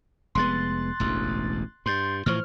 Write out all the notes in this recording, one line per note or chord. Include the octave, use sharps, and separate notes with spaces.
F1 G#3 B3 C6 F#6 A6
E1 A1 D2
G2 C6 G6 A6
A2 E3 F3 C5 C#6 F6